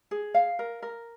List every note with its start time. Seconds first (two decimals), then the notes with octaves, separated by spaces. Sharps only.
0.11 G#4
0.34 F5
0.59 A#4
0.82 A#4